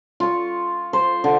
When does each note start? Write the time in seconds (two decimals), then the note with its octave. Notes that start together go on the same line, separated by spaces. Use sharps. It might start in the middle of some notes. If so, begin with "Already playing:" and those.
0.20 F4 C#6
0.93 C5
1.24 D3